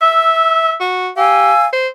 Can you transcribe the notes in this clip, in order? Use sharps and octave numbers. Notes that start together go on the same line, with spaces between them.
E5 E6
F#4
G4 F5 G#5 E6
C5